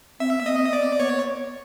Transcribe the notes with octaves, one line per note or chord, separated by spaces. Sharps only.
C4 E5
B3
C4 D#5
B3 D5
B3 C#5